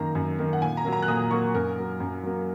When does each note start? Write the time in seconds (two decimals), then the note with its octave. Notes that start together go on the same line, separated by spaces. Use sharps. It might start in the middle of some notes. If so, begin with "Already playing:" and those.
Already playing: F#2 D#3 A#3 A#5
0.15 F#2
0.39 D#3 A#3
0.53 F#5
0.62 A#2 G#5
0.77 A#5
0.85 F#3 A#3
0.93 A#5
1.02 F#6
1.08 A#2 D#6
1.31 F#3 A#3 C#6
1.54 F#2 A#4
1.77 F#3 A#3
2.00 F#2
2.23 F#3 A#3